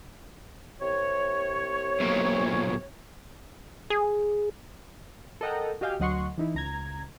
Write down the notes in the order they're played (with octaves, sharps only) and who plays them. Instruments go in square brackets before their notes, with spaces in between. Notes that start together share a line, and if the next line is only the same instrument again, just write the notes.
[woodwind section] C2 C3 C#5
[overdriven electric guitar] B1 A#2
[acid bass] G#4
[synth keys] A4 A#4 D#5 F#5 G5 A#5
F#4 G4 D#5 F5 G5 G#5
D2 F#3 D#5 F#5 C6 C#6
E3 D#4 E4
C#2 A#5 G#6